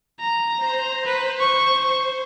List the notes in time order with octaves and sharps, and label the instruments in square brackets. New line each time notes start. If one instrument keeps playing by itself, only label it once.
[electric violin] A#5
[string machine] C5
[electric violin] B4
C#6